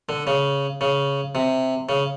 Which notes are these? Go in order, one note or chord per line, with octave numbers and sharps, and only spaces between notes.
D3
C#3
C#3
C3
C#3